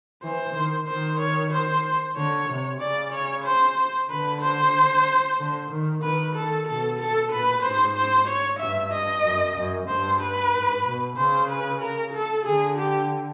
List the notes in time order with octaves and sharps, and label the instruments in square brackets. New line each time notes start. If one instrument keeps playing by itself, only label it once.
[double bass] E3 [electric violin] C5
[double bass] D#3
[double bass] D#3 [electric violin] C5
[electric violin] C#5
C5
[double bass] D3 [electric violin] C#5
[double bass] C3
[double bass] C#3 [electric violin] D5
[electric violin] C#5
C5
[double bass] D3 [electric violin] B4
[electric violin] C5
[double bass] D3
D#3
[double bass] D#3 [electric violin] B4
[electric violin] A4
[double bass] B2 [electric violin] A4
[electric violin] A4
[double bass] A#2 [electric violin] B4
[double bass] G#2 [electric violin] C5
[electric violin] C5
C#5
[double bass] G2 [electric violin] E5
[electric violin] D#5
[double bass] F#2
F#2
[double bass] G2 [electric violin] C5
[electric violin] B4
[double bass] G#2
B2
[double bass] C#3 [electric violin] C5
[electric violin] B4
A#4
A4
[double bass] D3 [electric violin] G#4
[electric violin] G4